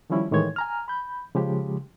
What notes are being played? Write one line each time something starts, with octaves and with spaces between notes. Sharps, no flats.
D#3 F3 G3 C#4 E4
A2 D#3 E3 G#3 C#5 G#6
G#5 A#5 F6
B5 G6
C#3 F3 G#3 G4